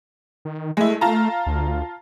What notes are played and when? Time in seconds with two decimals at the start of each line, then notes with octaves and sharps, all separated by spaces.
0.45 D#3
0.77 G#3 A3 E4
1.01 F4 A5 A#5
1.46 D2